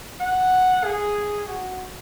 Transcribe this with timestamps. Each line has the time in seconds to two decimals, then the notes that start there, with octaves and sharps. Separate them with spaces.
0.20 F#5
0.84 G#4
1.47 F#4